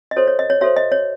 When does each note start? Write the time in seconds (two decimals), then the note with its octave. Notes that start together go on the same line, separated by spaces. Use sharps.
0.11 D#5
0.16 F#4 A4 C5 C#5
0.27 C#5
0.39 D#5
0.50 C#5
0.61 F#4 A4 C5 C#5 E5
0.77 D#5
0.92 C#5